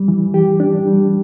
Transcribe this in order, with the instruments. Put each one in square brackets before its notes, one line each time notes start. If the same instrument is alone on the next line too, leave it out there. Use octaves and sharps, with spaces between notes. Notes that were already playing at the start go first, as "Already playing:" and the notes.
Already playing: [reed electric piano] G3
E3
G4
D4
G3